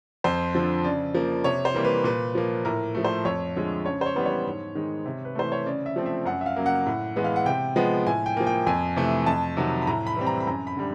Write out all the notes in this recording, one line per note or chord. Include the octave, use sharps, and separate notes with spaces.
F2 C5
D3 F3
C#3 D5
F3 A#3
C3 C#5
C5
E3 G3 A#3
B4
A#2 B4
F3 A#3
A2 A#4
F3 A3
C5
F2 C#5
D3 F3 G#3
C#3 C#5
C5
C#5
E3 G3 B3
C#5
G#2
D#3 G#3
C3
B4
E3 A3 C5
C#5
C#3 D5
E5
F3 A3 C4
E5
F#2 F#5
E5
F5
C#3 F#3 A#3
F#5
A2
E3 G#3 B3
F5
F#5
C3 G5
F3 G#3 B3
A2 G#5
G5
F3 A#3
G5
F2 G#5
C3 E3 A3
F2 A5
C3 D#3 F#3
B5
A2 A#5
B5
E3 G3 C4
A#5
B5
F#2 A#5
B5
D3 G3